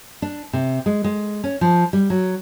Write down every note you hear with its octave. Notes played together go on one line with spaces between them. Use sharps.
D4
C3
G#3
G#3
C#4
F3
G3
F#3